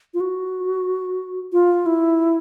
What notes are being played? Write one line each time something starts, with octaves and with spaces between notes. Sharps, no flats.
F4
F#4
F4
E4